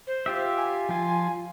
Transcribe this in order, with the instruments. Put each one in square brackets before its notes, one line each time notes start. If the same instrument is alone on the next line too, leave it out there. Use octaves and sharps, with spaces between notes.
[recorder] C5
[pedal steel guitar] F4 G4 E5
[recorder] G#5
[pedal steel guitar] F3 F4